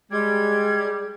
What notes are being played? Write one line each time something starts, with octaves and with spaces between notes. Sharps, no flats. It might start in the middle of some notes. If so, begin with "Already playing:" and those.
G3 G#3 G#4 G#6